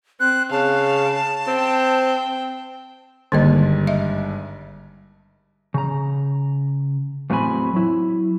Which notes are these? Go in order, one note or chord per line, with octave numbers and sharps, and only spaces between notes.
C4 F#6
C#3 F5 A5
C4 G5
G#1 G2 D3 A#3 D#5
D#5 E5
C#3 A#5
E2 A2 F#3 C4 G#5 B5
F#3 E4